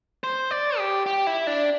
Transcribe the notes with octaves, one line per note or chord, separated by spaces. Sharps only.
C5
D5
G4
G4
E4
D4